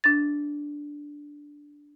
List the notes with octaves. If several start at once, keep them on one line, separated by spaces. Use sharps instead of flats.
D4 A6